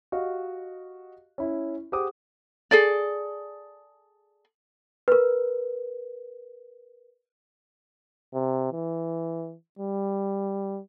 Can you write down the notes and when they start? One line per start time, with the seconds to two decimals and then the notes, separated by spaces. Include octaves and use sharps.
0.12 F#4 G4 D#5 F5
1.38 C#4 E4
1.92 G4 G#4 C5 F#5 D6 D#6
2.71 G#4 A4 D5
5.08 A#4 B4
8.34 C3
8.72 E3
9.79 G3